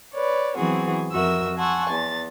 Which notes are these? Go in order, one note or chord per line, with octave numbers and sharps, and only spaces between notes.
B4 C#5 D5
E3 F#3 B3 C4 F#4 G#4
F2 F#4 A#4 E5 E6
F#5 G#5 A5 C6 C#6 E6
E2 A6